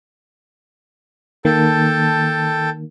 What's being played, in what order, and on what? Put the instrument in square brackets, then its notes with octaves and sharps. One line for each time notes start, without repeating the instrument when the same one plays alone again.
[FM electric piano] D#3 A#3 [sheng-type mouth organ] A4 G5 A5